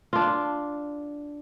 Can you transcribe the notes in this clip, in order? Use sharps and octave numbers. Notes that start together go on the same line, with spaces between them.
D4 F4